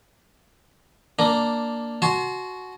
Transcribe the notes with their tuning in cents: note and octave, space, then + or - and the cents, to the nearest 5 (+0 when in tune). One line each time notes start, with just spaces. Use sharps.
A#3 +0 D4 +0 A#5 +0
F#4 +0 A5 -45 C6 +0